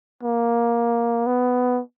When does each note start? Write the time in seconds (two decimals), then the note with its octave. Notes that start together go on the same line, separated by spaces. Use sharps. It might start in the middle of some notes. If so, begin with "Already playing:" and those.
0.23 A#3
1.27 B3